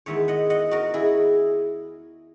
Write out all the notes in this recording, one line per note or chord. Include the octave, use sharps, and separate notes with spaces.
E2 D#3 G#3 B3 C#5 E5
D#5 F#5
D#5 F#5
F#4 A#4
E4 G#4